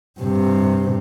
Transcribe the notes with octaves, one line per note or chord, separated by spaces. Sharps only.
G2 C3